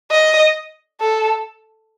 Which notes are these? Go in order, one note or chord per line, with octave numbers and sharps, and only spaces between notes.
D#5
A4